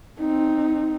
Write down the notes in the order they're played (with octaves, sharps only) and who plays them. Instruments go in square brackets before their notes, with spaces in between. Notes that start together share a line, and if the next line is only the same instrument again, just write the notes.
[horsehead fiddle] C4 D#4